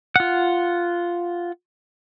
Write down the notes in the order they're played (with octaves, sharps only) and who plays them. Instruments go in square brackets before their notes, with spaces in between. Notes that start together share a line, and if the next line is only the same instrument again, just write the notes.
[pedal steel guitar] F4 F#5